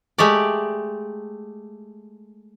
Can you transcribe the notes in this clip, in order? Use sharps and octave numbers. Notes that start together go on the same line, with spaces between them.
G#3 A3 G4 D5